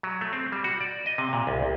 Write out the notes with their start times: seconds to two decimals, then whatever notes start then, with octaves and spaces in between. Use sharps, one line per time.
0.03 F#3
0.21 A3
0.33 C4
0.52 G3
0.64 F#4
0.80 D5
1.06 D#5
1.18 C3
1.33 A#2
1.47 C2
1.63 C2